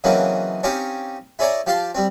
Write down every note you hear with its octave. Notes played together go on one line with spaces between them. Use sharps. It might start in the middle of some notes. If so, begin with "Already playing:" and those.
C#3 E3 F#3 A#3 C4 D#4
C4 C#4 D#4 G4 C#5 F5
E4 G#4 C#5 D5 G#5 A#5
F3 G4 F5 A5 C6
G3 C4